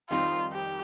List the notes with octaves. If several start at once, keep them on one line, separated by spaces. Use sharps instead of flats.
F2 D#3 G3 C4 D#4 F4
G4